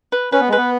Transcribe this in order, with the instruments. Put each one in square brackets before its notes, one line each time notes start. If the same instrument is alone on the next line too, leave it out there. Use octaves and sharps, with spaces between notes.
[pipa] B4
[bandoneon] C#4 [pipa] B4
[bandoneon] B3
G#3
[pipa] B4
[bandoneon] B3